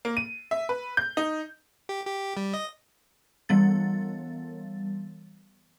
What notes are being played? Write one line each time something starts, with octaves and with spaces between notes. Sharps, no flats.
A#3
D#7
E5
B4
G6
D#4
G4
G4
G3
D#5
E3 G3 B3 A6